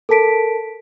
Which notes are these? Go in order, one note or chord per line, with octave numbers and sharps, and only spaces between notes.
A4 A#4 A5 B6 D7